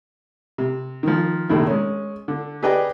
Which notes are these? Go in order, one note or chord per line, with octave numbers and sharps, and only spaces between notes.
C3
D#3 F3
A#1 C3 D#3 A3 E4
G#3 C#4
D3
G4 G#4 B4 D5 D#5 G5